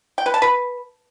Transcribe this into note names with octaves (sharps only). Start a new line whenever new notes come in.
G5
B4
A5
B4